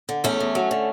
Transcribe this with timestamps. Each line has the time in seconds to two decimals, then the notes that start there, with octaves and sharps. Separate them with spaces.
0.09 D3
0.24 E2 A3 C#4
0.40 E2
0.55 F#3
0.71 D3